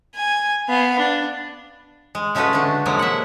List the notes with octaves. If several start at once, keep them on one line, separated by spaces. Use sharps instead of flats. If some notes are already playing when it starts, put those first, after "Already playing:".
G#5
B3 F5
D4
G#3
C#3 G#3 A3 C#4 F#4 B4
D3 D4
C3 F3 F#3 G#3 A#3
E5 F#5